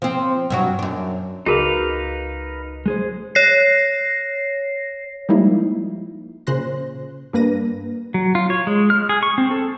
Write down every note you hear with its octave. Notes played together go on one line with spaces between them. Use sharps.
F3 C4
G2 F#3 F#4
F#2 D4
C#2 D#4 F#4 G#4 A#4 B4 F5
G#3 G#4 C5
C#5 A#6 C7
F3 G3 G#3 A#3 D#4 E4
A#2 C#3 C5 C6 F#6 A#6
G2 A#3 B4 A#6 D#7
F#3
F4
C#5
G#3
F6
G#4
C#6
C4
A4